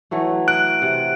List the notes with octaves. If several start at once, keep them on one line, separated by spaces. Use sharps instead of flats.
E3 F#3 A3
F#6 D7
C3 F#5